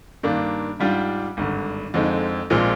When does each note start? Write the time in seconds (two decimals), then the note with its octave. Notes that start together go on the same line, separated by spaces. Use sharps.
0.23 G2 D#3 A#3 D4
0.79 G#2 G3 D4 F4
1.37 G#1 G2 D3
1.94 F2 D3 G#3 C4 D#4
2.50 A#1 A#2 F3 G#3 C4